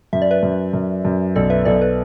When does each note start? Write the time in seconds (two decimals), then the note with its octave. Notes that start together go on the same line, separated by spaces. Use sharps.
0.13 F#2 E5
0.22 D5
0.31 B4 E5
0.43 F#2
0.73 F#2
1.05 F#2
1.36 B1 A4 D5
1.50 B4 E5
1.65 B1 A4 D5
1.81 B4